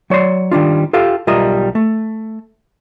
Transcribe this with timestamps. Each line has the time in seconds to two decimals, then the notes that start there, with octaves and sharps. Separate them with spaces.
0.10 F#3 C#5 D5 C6
0.51 D#3 G3 D4 F4
0.93 F4 G4 A4 F5
1.27 B1 G3 F4 A#4 D#5 E5
1.75 A3